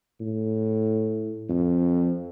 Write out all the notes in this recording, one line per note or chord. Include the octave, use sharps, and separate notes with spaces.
A2
F2